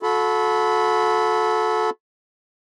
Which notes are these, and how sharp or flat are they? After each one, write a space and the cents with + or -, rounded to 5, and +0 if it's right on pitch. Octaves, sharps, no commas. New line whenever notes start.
F#4 -40 A4 -20 B5 +5